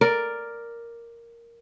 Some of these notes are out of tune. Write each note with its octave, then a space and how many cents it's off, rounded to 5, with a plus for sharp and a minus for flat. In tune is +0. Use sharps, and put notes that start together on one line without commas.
A#4 +0 D5 +0